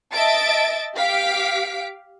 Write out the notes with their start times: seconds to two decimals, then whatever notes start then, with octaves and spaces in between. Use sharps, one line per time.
0.13 D#5 E5 A5 A6 D7
0.96 G4 F5 B6 D7